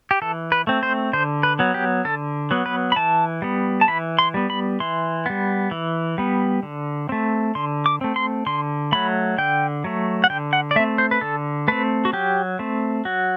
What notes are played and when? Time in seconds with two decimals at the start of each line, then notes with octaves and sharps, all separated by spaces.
0.11 G4
0.22 E3 A4
0.52 B4
0.67 A3 C4
0.83 C5
1.13 D3 C5
1.43 B4
1.59 F#3 B3
1.74 G4
2.05 D3 A4
2.51 F#3 B3
2.66 B4
2.92 B5
2.96 E3 A5
3.42 G3 B3
3.81 A5
3.88 E3 B5
4.19 C6
4.34 G3 B3
4.50 B5
4.80 E3 C6
5.26 G3 B3
5.71 E3
6.18 G3 B3
6.63 D3
7.09 A3 C4
7.55 D3 C6
7.86 D6
8.01 A3 C4
8.16 C6
8.46 D3 C6
8.92 F#3 A3 B5
9.38 D3 G5
9.84 F#3 A3
10.24 F#5
10.30 D3 G5
10.53 F#5
10.71 D5
10.76 A3 E5
10.79 C4
10.98 C5
11.11 B4
11.21 D3 A4
11.68 A3 C4 B4
12.05 F#4
12.13 F#3 G4
12.59 A3 C4
13.05 F#3 F#4